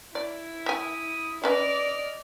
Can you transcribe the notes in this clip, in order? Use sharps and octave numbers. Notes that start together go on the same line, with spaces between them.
E4 D5
E5 G#5 D#6
C#4 B4 D5 D#5 F6